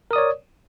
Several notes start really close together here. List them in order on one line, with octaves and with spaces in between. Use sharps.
A#4 D#6 D5 C#5